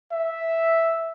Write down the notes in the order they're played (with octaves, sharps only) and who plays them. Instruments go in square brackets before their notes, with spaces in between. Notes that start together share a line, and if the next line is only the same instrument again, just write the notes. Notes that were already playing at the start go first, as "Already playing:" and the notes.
[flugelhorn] E5